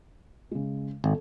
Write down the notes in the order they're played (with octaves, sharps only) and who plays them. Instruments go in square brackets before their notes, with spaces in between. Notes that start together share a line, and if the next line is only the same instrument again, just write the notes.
[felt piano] C#3 G#3
[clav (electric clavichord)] G#1 [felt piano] A4